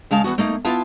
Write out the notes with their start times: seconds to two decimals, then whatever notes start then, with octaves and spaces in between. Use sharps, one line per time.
0.11 C#3 G#3 F5 A5
0.24 E2 A3 B3 F#4
0.38 A3 A#3 D#4
0.65 B3 E4 F4 E5 F5 A5